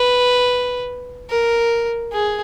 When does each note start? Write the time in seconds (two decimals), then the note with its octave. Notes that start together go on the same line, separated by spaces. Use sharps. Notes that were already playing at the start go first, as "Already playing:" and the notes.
Already playing: B4
1.29 A#4
2.12 G#4